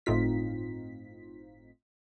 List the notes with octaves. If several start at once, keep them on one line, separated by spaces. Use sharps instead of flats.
G1 A2 C4 D#4 F4 B6